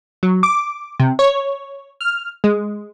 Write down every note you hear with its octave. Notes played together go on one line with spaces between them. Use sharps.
F#3
D6
C3
C#5
F6
G#3